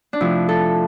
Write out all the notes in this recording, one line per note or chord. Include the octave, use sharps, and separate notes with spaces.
D4
F2 C3 F3 A3 E4
A4